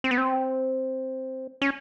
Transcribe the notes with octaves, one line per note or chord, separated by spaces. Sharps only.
C4
B3
C4
C#4